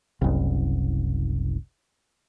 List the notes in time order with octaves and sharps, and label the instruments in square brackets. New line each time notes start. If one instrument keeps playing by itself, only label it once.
[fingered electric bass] F#1 C2